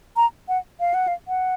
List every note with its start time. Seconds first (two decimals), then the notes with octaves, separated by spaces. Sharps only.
0.16 A#5
0.48 F#5
0.80 F5
0.94 F#5
1.08 F5
1.28 F#5